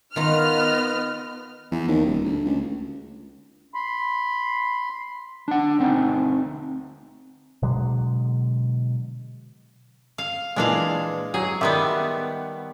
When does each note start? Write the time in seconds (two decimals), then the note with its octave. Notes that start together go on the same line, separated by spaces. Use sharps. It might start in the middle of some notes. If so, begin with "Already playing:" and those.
0.16 D#3 B3 F4 D#5 A#5 F6
1.72 E2
1.88 D#2
2.06 D#1
2.25 D2
2.45 C#2
3.74 B5 C6
5.48 D4 F#5
5.79 D2 C4 D#4
7.63 B2 D3 F#3 G#3
10.18 F5
10.56 A#2 E3 G#3 D4 F5
11.34 F#3 G#4
11.61 D#3 G3 B3 E5 C6 D6